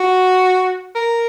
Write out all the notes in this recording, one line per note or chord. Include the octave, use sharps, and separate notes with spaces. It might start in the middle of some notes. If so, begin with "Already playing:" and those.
Already playing: F#4
A#4